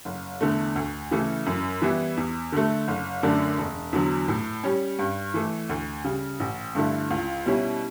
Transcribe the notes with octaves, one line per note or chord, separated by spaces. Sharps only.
F#1
E2 D3 A3
D2
C#3 E3 A3 E4
F#2
E3 G3 B3 E4
E2
D3 A3
F#1
F#2 D3 A3 D4
E1
E2 D3 F#3
A2
G3 C#4
G2
E3 A3
D2
C#3 G3
A1
G2 D3 A3 E4
C#2
B2 G3 C#4 E4